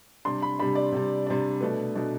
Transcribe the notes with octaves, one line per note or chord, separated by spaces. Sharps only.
C3 G3 D4 C6
B5
C3 G3 D4 B5
D5
C3 G3 D4
C3 G3 D4
B2 A3 D4 B4
B2 A3 D4